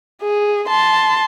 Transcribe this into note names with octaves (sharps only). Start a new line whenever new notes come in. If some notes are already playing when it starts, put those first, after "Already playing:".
G#4
A5 C6